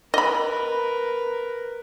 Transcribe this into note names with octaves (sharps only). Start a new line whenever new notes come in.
A#4 B4 D#5 B5